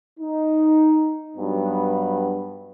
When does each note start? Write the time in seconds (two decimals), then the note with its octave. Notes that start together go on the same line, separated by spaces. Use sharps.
0.20 D#4
1.37 G2 F#3 B3